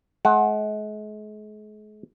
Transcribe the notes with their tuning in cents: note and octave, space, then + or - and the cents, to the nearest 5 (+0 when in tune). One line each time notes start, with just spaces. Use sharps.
G#3 +40 F#5 +5